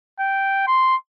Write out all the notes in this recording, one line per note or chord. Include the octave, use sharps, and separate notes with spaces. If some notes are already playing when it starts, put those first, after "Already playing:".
G5
C6